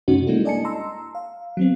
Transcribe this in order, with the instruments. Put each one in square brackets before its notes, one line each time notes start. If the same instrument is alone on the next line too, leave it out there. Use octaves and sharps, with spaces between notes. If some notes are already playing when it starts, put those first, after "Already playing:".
[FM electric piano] F#2 C3 A3 C#4 D#4 F#4
G3 G#3 A#3 D4 E4 A4
D5 D#5 G#5 A5 C#7
A5 A#5 C6 E6
F5
F#3 B3 C4